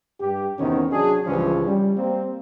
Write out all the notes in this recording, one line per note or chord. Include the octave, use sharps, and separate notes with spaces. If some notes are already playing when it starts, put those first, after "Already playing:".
G2 G4
E2 C3 D#3 B3 C#4
F#3 D4 G#4
C#2 G2 C#3 E3 F3 C#4
G3
G3 A#3 C4